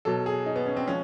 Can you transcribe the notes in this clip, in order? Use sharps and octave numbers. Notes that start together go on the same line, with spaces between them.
B2 F#3 A4
G#4
D#4
B3
C#4
C4
F3 G#3 C#4